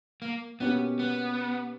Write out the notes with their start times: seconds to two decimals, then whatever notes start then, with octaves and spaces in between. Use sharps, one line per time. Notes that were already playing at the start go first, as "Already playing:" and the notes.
0.22 A#3
0.60 B2 A#3 B3 C#4 G4
0.99 B3